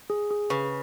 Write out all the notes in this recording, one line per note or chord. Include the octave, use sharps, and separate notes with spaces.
G#4
G#4
C#3 B4